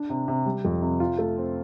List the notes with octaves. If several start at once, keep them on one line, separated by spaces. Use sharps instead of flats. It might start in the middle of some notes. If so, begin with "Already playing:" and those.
Already playing: D4
C3
C3
G3
F2
C3
F4
A3
C4